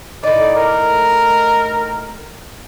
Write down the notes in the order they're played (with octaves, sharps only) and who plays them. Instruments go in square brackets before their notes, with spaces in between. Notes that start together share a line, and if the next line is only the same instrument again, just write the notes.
[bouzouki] A2 D#4 [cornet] D5
[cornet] A#4